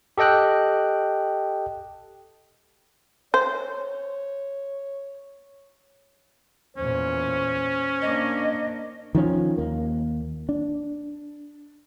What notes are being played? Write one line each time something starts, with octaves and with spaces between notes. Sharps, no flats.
G4 A4 D#5 G5 F#6
C5 C#5
E2 A#2 C#4 C5
A#3 D4 D#5
D#3 F3 C#4
D#2 A#3
D4